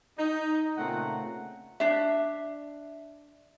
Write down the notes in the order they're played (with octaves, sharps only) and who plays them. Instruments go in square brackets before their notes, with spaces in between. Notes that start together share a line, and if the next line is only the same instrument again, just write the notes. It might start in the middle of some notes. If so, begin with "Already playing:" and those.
[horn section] D#4
A#2 C#3 A3 C4 F#5 A#5
[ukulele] D4 E5